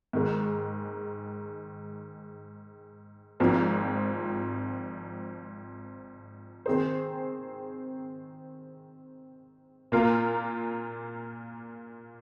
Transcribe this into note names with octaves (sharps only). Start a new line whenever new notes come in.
G#2 D#3 G#3
G#1 G#2 F3 C4
D#3 C4 G#4 C5
A#2 A#3 F4 A#4